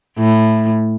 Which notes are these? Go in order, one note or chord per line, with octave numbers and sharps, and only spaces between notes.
A2